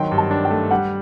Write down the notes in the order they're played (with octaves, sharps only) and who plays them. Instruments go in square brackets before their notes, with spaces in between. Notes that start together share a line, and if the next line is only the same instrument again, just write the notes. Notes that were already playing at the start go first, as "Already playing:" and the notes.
Already playing: [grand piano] D#3 F#3 [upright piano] G5 C6
[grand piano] G2
[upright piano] A5
[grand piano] D4
[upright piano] G5
[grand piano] A3
[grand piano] G3 [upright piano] F#5